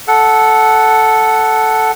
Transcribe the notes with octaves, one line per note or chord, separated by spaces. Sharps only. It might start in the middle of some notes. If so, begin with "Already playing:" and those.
A4 F#5